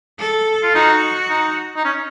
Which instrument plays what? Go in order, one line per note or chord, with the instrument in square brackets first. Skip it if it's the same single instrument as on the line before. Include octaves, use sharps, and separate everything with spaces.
[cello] A4
[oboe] F4
[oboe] D#4 [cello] F#4
[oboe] D#4
D#4
C#4